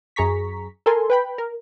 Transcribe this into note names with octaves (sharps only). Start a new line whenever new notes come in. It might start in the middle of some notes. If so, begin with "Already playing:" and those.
F#2 G#4 A#5 C#6 B6
A4 A#4 G#5 C6
B4 G5 B5
A#4